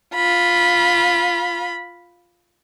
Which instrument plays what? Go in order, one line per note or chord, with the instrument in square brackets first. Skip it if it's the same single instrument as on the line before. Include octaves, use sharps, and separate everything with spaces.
[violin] F4 B5